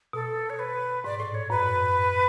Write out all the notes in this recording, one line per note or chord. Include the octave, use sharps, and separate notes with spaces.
B2 A4
C#5
B4
G#2 D5
A2 D5
C#5
F#2 B4